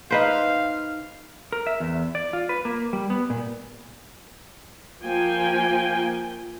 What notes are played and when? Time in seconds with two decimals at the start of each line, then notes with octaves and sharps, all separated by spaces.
0.11 D#4 B4 C5 F5
1.52 A#4
1.67 E5
1.80 E2
2.15 D5
2.33 F4
2.49 B4
2.65 A#3
2.93 G3
3.10 B3
3.30 A#2
5.04 F3 A#3 G5 G#5